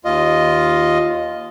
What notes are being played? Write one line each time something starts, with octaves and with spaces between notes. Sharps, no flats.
D#2 F4 D#5